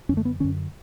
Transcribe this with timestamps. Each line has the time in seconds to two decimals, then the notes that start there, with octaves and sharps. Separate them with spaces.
0.09 F#2 C#4
0.12 D3 A3
0.25 B3
0.40 F#2 D3 C#4